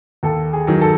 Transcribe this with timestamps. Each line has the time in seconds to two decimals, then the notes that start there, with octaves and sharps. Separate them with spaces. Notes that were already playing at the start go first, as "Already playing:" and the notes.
0.23 D#2 A4
0.53 G#4
0.67 D#3 F#3
0.82 A4